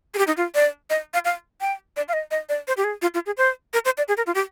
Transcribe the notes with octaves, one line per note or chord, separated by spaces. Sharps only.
G#4
G4
D#4
F4
D5
D#5
F5
F5
G5
D5
F5
D#5
D#5
D5
C5
G4
G#4
F4
F4
G#4
C5
A#4
C5
D5
G#4
A#4
F4
G4